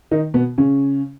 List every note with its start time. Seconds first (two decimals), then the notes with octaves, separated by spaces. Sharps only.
0.11 D#3 D#4
0.34 B2 B3
0.58 C#3 C#4